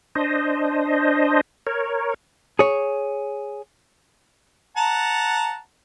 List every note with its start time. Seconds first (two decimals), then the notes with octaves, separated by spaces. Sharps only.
0.15 D4 C5 D#5
1.67 A#4 C#5
2.59 G#4 C#5
4.77 F#5 A5 A#5